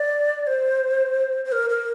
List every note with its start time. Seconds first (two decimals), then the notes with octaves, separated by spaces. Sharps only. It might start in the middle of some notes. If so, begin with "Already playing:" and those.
Already playing: D5
0.47 C5
1.45 C5
1.52 A#4
1.70 A#4